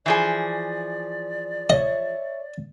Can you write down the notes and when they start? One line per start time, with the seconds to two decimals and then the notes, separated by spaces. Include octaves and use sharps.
0.06 E3 F3 G#4 D5
1.70 C#5 D#5 E5